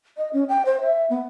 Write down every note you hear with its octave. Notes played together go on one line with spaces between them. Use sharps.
D#5
C#4
G5
C5
E5
B3